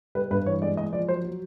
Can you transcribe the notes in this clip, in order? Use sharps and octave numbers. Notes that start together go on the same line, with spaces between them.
G3 B4
G2 B4
E3 C#5
G#3 D5
G#3 D#5
F3 D5
F#3 C5
F#3